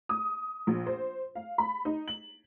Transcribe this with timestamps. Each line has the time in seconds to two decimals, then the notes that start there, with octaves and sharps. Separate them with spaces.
0.09 D#6
0.67 A#1
0.86 C5
1.35 F5
1.58 B5
1.85 D#4
2.08 F#7